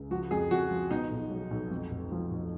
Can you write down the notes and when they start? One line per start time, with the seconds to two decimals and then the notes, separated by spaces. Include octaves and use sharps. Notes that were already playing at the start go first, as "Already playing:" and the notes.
Already playing: C#2
0.11 F3 F#4
0.31 F2 G#4
0.51 F2 F#4
0.71 F3
0.91 B2 D#4
1.11 B1
1.30 F#3
1.51 B1
1.71 F2
1.91 F1
2.12 F3
2.31 F1